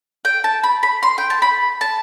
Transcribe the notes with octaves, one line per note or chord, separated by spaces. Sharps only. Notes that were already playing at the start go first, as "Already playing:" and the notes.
G5
A5
B5
B5
C6
G5
A5
B5
A5